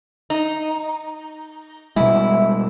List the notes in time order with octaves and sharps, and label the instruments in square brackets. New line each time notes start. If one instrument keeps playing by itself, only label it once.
[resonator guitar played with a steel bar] D#4
[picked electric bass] B2 G3 G#3 [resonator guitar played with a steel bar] E4